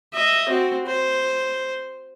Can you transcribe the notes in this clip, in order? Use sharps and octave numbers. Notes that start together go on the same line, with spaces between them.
D#5 E5
C4 F#4
C5